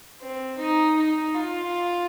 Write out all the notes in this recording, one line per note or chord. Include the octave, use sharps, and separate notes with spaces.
C4
D#4
D#4
F4